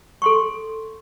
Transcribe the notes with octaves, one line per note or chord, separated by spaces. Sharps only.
A4 C6 C#6